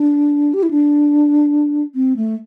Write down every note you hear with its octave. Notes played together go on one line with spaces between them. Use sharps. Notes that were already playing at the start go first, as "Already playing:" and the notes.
Already playing: D4
G4
E4
D4
C4
A3